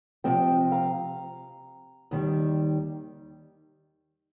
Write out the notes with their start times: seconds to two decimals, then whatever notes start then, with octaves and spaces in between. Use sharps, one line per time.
0.24 C3 F3 C4 D#5 G5
0.72 F5 A#5
2.11 D#2 D#3 G3